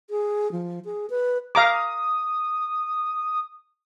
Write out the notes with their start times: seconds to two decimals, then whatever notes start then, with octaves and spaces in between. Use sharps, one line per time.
0.10 G#4
0.52 F3
0.85 G#4
1.10 B4
1.55 F5 A#5 D6 D#6